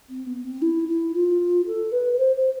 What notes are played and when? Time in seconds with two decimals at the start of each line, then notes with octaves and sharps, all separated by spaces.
0.10 C4
0.27 B3
0.44 C4
0.62 E4
0.88 E4
1.14 F4
1.67 A4
1.92 B4
2.13 B4
2.18 C5
2.36 C5